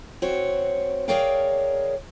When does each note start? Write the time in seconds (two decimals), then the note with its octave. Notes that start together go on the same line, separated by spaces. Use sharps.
0.22 C4 F#4 C#5
1.08 G#4 A#4 C#5 D5 F5 G5